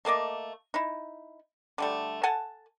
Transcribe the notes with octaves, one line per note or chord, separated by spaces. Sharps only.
A3 A#3 D5 D#5
D#4 E4
D3 G3 A3
A4 F#5 G#5 A5